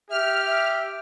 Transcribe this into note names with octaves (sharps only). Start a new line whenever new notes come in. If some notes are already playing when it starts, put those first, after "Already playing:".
G4 E5 F6
E5